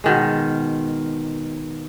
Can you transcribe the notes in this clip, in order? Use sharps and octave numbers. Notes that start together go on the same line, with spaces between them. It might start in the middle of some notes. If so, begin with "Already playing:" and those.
B2 D#3 G#3